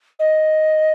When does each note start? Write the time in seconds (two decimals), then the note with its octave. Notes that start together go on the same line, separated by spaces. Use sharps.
0.19 D#5